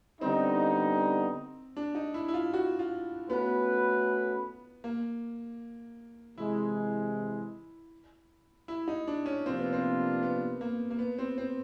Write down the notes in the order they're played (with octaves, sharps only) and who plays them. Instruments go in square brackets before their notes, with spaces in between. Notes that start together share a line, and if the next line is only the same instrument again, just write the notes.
[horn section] D3 G3 B3 D#4 [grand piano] C4
[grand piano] D4
D#4
E4
E4
F4
F#4
F4
[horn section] A3 C#4 F#4 B4 [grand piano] B3
[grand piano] A#3
[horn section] C3 E3 G#3 [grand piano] E4
[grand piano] E4
D#4
D4
C#4
[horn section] C3 F3 A#3 D4 F4 [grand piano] C4
[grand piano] B3
C4
B3
A#3
A#3
B3
C4
C4